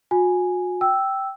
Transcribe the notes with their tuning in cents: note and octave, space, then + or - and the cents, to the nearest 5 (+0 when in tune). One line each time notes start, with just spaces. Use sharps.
F#4 -40 G#5 +0
G5 -10 E6 +0